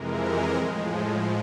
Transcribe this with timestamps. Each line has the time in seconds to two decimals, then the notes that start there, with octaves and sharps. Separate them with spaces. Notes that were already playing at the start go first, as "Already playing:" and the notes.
Already playing: F2 C3 E3 G#3 A#4
0.22 A#4
0.55 A2 F3 G#3